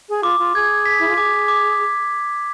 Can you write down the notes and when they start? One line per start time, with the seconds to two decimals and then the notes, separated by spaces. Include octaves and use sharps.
0.09 G#4
0.23 F4 D6
0.39 F4
0.55 G#4 G#6
0.86 B6
1.00 E4
1.07 F4
1.17 G#4 D6
1.48 D6